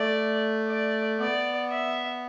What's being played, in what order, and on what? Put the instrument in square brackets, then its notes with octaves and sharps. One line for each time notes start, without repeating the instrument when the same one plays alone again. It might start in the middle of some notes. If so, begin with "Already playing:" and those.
Already playing: [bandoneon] A3 [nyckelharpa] D5
[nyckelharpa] D5
[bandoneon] B3 [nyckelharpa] D5
[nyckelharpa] E5